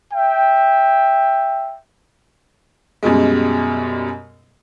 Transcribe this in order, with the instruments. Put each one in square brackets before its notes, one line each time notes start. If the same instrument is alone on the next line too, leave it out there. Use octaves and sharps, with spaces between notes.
[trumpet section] E5 G5
[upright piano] F#2 B2 G3 G#3